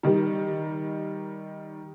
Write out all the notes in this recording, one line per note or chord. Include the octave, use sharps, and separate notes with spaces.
D#3 G3